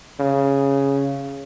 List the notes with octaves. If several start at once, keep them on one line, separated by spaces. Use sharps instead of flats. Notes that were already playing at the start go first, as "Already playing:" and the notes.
C#3